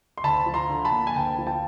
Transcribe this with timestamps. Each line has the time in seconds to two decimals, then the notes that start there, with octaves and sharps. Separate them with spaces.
0.18 C6
0.24 D2 A5 B5
0.46 F3
0.54 A#5 C6
0.70 D3
0.85 A5 B5
0.92 A#3
1.07 G#5
1.16 D2 G5 A5
1.38 F3
1.47 G5 A5